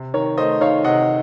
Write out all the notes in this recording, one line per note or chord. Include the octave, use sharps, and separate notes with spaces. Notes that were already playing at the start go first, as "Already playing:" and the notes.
Already playing: C3
D#3 A#4 C#5
A3 C5 D#5
D#3 C#5 F5
C3 D#5 F#5